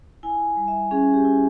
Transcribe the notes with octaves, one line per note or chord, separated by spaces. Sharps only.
E4 G#5
G3
E5
C#4 G#4
G4
E4